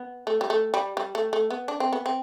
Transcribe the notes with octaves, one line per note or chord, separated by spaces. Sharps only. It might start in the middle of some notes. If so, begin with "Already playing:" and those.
Already playing: B3
A3
G3
A3
G3
G3
A3
A3
B3
D4
C4
B3
C4